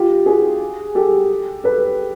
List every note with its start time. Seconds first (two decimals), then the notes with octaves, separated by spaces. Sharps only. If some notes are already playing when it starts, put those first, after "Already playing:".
Already playing: F4 G4
0.26 F#4 G#4
0.95 G4 A4
1.64 A4 B4